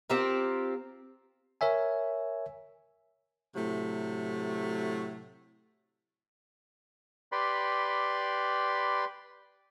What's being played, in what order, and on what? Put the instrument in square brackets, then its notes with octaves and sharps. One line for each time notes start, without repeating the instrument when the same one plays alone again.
[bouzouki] C4 F4 G4 A#4
[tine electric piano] A#4 C#5 E5 G#5
[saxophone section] A2 C3 F#3 A3
[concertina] G4 B4 D5 B5 C6